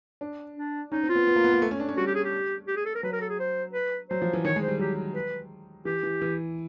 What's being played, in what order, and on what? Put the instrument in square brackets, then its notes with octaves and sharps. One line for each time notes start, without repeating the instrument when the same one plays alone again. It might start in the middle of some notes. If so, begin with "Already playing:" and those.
[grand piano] D4
[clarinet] D4
[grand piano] C#4 [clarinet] D#4
[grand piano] C4
[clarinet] F4
[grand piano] B3
B3
A#3
B3
A#3
A3
C#4
D4
C#4
[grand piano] G3 [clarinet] F#4
[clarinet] G4
G#4
G4
G4
G#4
A4
A#4
[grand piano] F#3 [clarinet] B4
[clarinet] A#4
A4
G#4
C5
B4
[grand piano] F#3 [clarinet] C5
[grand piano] F3
E3
[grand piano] D#3 [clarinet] C#5
[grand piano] G#3
[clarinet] C5
[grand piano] G3
[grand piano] F#3 [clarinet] G4
[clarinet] B4
[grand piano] E3 [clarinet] G4
[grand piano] E3
E3